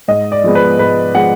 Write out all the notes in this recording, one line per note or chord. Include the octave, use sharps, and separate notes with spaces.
G#2 D#5
D5
F3 G#3 B3
B4
G#2 B4
F3 G#3 B3 F#5